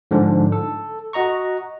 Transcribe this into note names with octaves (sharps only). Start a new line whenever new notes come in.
G#2 D3 F3 D4
A4
F#4 D#5 A#5 C#6